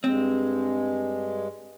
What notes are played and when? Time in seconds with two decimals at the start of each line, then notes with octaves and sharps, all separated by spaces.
0.04 G2 G#3 C4